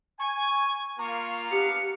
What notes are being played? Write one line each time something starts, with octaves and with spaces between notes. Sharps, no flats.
G#5 C#6
A#3 F4 A#5 C#6
B3 D4 G4 F5 C#7